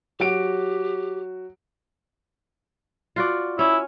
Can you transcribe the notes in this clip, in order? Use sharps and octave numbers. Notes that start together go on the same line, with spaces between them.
F#3 F#4 G4 D7
F4 F#4 D5
C#4 E4